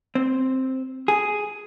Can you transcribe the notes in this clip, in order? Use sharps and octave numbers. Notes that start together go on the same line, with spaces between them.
C4
G#4